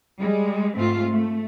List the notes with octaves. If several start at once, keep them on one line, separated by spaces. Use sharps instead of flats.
G3 G#3
G#2 A3 C4 F4
A3